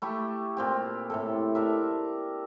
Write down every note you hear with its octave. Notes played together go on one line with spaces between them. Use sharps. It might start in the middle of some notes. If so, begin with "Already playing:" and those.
A3 E4 G4 C#6
A#2 C4 G4
A2 C3 A4
D4 A#4 E5